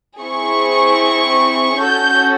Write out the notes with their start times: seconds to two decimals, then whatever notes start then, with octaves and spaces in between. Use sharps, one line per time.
0.21 C4 E4 G#4 C#6
1.84 C#4 F#4 A4 G6